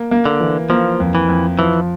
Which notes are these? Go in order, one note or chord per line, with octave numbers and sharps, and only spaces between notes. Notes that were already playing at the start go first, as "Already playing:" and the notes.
Already playing: A#3
A#3
D3
E3
F3 A#3
F2
E3
F2
E3 F3